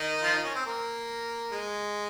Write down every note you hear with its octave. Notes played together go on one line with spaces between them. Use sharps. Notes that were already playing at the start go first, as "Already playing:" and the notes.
Already playing: D#3 D#4
F3 F4
D#3 D#4
C#4
C4
A#3
G#3